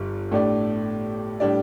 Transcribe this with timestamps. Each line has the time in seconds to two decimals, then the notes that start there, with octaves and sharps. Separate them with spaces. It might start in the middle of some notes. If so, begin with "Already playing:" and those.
Already playing: G1 G2 G3
0.32 A2 A3 D4 G4 D5
1.40 A2 G3 D4 G4 D5